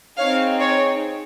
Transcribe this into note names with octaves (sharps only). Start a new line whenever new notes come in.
C4 D#4 G#4 C#5 F5
C#5